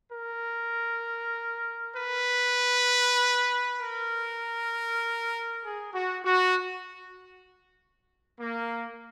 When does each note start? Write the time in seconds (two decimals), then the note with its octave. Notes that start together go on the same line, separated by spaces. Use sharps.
0.11 A#4
1.95 B4
3.78 A#4
5.63 G#4
5.94 F#4
6.23 F#4
8.39 A#3